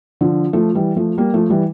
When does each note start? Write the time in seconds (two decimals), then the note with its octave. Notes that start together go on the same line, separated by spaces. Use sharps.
0.21 D3 F3
0.53 F3 A3
0.75 E3 G3
0.96 F3 A3
1.18 G3 A#3
1.34 F3 A3
1.50 E3 G3